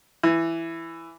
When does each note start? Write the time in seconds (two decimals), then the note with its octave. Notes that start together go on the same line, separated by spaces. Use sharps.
0.23 E3